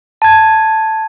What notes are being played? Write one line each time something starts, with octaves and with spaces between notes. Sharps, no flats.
A5 G#6